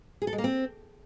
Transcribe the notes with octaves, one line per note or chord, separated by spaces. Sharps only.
G#4
A4
G#3
A#3
C4